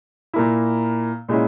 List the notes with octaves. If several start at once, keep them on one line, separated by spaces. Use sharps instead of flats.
A#2 A#3 E4
A#2 G#3 C#4 E4